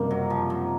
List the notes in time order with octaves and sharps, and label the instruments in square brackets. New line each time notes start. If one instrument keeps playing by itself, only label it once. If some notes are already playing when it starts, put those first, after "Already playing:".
Already playing: [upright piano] F#1 F2 C3 D#3 G3 [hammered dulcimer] A#3
[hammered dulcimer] F#3
F3
F#3